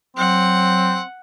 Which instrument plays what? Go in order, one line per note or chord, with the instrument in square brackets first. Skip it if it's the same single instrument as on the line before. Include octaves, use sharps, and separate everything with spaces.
[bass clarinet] F#3 [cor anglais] C4 [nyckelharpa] F#5